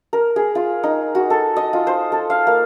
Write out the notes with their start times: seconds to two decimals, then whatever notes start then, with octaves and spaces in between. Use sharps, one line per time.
0.13 A#4
0.36 G#4
0.55 F4
0.83 D#4
1.15 F#4
1.30 A4
1.57 D#5
1.73 F4
1.87 C5
2.12 A4
2.30 F5
2.47 A#3